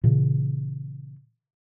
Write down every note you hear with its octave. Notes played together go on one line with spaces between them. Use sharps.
A#2 C#3 E3